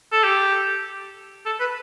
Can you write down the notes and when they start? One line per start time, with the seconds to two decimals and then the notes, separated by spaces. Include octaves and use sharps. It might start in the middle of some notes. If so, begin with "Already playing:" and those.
0.12 A4
0.23 G4
1.46 A4
1.60 B4